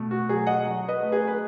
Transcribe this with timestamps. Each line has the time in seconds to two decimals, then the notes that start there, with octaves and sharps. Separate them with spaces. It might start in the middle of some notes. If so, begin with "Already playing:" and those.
Already playing: B2 A3
0.11 F#4
0.29 F#3 G#4
0.47 D#5 F#5
0.65 F#3
0.88 B4 D#5
1.00 A3
1.12 G#4 B4
1.28 B4